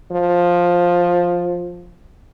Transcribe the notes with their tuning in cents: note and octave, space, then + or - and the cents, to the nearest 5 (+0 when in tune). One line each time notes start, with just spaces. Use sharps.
F3 +10